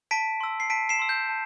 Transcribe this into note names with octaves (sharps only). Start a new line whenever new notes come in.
A5 B6 D7
C6 E6
C7
A5 B6 D7
C7 E7
C6 E6
G6
A5